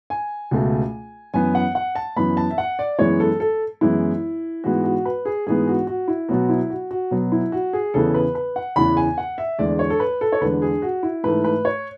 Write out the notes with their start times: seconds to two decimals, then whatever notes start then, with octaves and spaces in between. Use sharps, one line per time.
0.10 G#5
0.51 C#2 B2 A3
1.34 F#2 E3 B3 G#5
1.55 F#5
1.75 F#5
1.95 A5
2.16 F#2 E3 B3 B5
2.37 A5
2.51 E5
2.58 F#5
2.79 D5
2.99 F#2 E3 G#3 B3 C#5
3.20 A4
3.40 A4
3.81 F#2 E3 G#3 B3 E4
4.64 G#2 E3 G#3 B3 F#4
4.84 F#4
5.05 B4
5.25 G#4
5.46 G#2 E3 G#3 B3 G#4
5.68 F#4
5.87 F#4
6.08 E4
6.29 B2 F#3 B3 F#4
6.49 E4
6.70 F#4
6.91 F#4
7.11 B2 F#3 B3
7.32 E4
7.52 F#4
7.73 G#4
7.94 E2 C#3 E3 B3 A4
8.14 B4
8.35 B4
8.56 F#5
8.76 E2 C#3 E3 B3 B5
8.97 G#5
9.18 F#5
9.38 E5
9.59 E2 D3 G#3 D5
9.79 C#5
9.90 A4
10.00 B4
10.21 A4
10.32 C#5
10.41 E2 D3 G#3 B4
10.62 G#4
10.82 F#4
11.03 E4
11.23 G#2 E3 A3 B4
11.44 B4
11.65 C#5